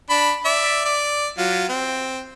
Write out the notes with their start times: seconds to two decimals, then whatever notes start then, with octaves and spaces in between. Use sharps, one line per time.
0.10 D4 B5
0.45 D5 E5
0.85 D5
1.38 F#3 F4
1.69 C4